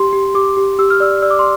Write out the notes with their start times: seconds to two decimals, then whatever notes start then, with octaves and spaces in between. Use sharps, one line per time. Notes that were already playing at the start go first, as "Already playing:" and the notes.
Already playing: G4 C6
0.13 G4
0.35 G4 D6
0.57 G4
0.79 G4 E6
0.90 F6
1.00 D5 E6
1.22 D5 E6
1.31 D6
1.39 C6